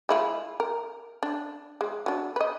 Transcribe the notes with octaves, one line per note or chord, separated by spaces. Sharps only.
G#3 E4 F4
A#4
D4
G#3
F#3 D4
B4 D#5